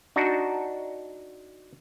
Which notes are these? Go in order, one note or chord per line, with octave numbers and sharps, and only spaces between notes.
D4 D#4 F#4